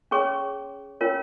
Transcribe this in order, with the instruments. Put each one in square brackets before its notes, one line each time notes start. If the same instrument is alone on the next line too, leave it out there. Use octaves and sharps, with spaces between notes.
[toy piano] C#4 G#4 C#5 C#6
C#4 F4 A#4 C#5